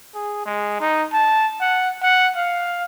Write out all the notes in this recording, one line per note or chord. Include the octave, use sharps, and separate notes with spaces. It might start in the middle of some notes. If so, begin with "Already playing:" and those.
G#4
G#3
D#4
A5
F#5
F#5
F5